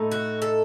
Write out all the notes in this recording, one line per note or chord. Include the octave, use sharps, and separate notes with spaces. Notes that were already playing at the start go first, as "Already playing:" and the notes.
Already playing: A2 A3 D#4
F#4
A4